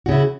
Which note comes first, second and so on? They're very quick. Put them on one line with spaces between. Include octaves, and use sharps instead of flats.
F#4 C#3 E4